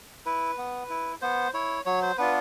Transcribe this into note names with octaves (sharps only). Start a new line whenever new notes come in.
E4 B4
B3
E4
B3 C5
E4 C#5
F#3 C#5
C5
B3 D4 F4 B4